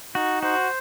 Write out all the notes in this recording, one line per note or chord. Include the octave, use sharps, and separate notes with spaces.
D#4 F#4
F#4 C5